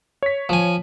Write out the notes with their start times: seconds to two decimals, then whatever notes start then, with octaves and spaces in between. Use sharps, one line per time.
0.23 C#5 B6
0.49 F3 G#5